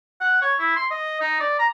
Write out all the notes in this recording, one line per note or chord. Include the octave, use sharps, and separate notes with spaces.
F#5
C#5
E4
C6
D#5
D#4
D5
A#5